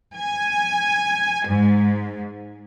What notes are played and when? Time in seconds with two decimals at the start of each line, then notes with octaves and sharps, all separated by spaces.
0.15 G#5
1.47 G#2